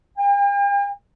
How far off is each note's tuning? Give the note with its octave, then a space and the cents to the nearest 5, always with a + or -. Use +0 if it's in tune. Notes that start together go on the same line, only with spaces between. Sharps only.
G5 +45